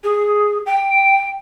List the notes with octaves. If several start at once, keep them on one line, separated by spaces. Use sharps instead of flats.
G#4
G5